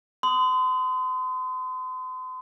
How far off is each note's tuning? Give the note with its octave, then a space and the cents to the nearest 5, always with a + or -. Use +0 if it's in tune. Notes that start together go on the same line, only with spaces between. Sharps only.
C6 -40 D#6 +0